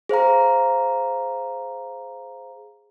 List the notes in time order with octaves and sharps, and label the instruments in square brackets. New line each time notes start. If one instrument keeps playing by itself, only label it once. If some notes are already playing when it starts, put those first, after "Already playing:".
[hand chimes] G#4 C5 F5 A#5